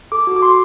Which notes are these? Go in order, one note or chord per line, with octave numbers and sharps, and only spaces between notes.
A4 D6
F#4
D6
A4 C6